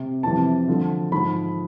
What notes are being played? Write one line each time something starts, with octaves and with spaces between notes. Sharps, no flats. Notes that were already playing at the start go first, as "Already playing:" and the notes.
Already playing: C3
F2 C3 E3 A5
D2 D3 F3
G#2 F3 B5